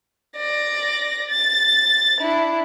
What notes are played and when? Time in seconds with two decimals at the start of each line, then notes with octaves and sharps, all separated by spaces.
0.36 D5 A#6
1.29 A6
2.20 D4 E4